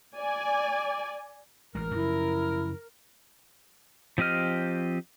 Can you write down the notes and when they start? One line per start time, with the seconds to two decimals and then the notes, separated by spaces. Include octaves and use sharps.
0.16 D5 G#5
1.75 A1 E3 G#3 A#4
1.94 F#2 C#3 F3 E4
4.18 F3 C4 G4 D#5 F6